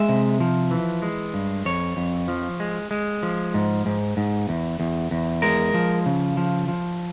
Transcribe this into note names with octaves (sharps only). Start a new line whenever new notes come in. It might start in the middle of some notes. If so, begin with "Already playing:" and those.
Already playing: G#3 E5
C3
F3
E3
G#3
G2
F2 C#5
F2
F3
G#3
G#3
F3
G#2
G#2
G#2
E2
E2
E2
G#3 A#4
F3
C#3
F3
F3